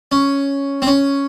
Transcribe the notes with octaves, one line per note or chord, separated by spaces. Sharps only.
C#4
C4
C#4